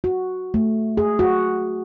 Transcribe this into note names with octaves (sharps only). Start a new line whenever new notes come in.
F#4
A3
G#4
F#4